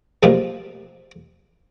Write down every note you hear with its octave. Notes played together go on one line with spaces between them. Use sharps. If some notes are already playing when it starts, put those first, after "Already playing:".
F#2 C3 F3 G3 G#3 A#3